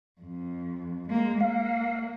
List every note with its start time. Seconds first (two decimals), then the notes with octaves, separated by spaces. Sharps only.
0.21 F2
1.08 G#3 A#3
1.41 A#3 F5